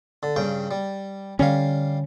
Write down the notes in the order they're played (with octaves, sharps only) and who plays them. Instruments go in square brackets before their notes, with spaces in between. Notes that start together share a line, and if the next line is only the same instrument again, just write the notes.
[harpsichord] D3
G2 C#3 G5
G3
[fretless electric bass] D3 C#4 [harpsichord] G3 F5